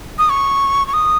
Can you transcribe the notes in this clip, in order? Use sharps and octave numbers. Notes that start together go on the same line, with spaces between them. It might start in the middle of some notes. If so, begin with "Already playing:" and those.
D#6
C#6
C#6
D#6